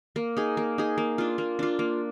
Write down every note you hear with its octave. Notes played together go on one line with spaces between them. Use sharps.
A#3
D#4 G#4
A#3
D#4 G#4
A#3
D4 F4
A#3
D4 F4
A#3